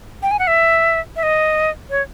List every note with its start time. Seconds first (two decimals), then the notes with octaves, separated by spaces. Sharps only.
0.23 G5
0.31 G#5
0.39 F#5
0.47 E5
1.16 E5
1.23 D#5
1.90 C#5